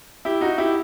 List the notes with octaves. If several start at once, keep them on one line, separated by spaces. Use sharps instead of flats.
E4 G4
D#4 F#4
E4 G4